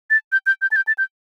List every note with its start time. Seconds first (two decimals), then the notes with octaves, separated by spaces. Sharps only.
0.10 A6
0.32 G6
0.46 G6
0.62 G6
0.72 A6
0.76 G6
0.87 A6
0.98 G6